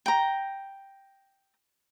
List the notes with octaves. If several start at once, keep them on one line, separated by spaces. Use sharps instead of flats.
G5 A#5